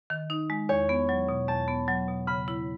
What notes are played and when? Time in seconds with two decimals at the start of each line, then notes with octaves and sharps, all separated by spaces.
0.10 D#3
0.30 D#4
0.50 G#3
0.69 E2 C#5
0.89 B3
1.09 F#3
1.29 B2
1.48 E2 A5
1.68 B3
1.88 F#3
2.08 B2
2.27 C#3 B5
2.48 E4